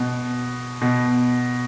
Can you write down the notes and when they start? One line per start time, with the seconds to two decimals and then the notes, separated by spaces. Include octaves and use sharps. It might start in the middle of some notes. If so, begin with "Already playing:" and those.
Already playing: B2
0.81 B2